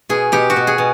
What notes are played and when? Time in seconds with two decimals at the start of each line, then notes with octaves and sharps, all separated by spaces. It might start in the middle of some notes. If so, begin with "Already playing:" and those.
0.09 B2 G#4
0.32 B2 G4
0.50 F#4
0.56 B2
0.67 G#4
0.78 B2